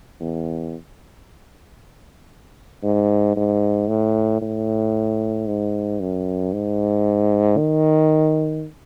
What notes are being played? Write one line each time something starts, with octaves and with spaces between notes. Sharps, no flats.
E2
G#2
G#2
A2
A2
G#2
F#2
G#2
D#3